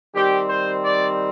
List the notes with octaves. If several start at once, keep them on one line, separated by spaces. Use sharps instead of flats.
D#3 G3 C4 G4
C5
D5